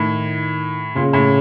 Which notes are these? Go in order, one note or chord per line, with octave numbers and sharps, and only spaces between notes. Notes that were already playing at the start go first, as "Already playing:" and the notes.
Already playing: A2 D#3
A#2 C#3
A2